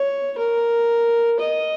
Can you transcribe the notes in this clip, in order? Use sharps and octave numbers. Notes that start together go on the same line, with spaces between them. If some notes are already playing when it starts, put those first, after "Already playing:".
Already playing: C#5
A#4
D#5